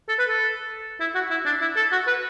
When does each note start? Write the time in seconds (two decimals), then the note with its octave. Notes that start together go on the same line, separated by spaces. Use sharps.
0.09 A4
0.19 B4
0.29 A4
1.00 E4
1.15 F#4
1.31 E4
1.46 D4
1.62 E4
1.77 A4
1.92 F#4
2.07 B4